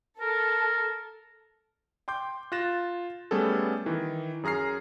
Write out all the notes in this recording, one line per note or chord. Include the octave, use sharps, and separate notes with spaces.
A4 A#4
G5 C6 D6 G6
F4 F#6 A6 A#6 E7
G3 A3 B3 C#4 G#4 A4
D#3 E3
F#2 G#4 A#5 F6 C7